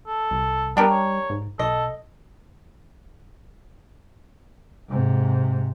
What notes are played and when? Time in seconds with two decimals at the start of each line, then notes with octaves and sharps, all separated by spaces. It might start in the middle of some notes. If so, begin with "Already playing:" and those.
0.08 A4
0.31 C2
0.77 G3 B3 D4 G4 A#4
0.90 C#5
1.30 G#2
1.59 B1 A4 D#5
4.89 G#2 C3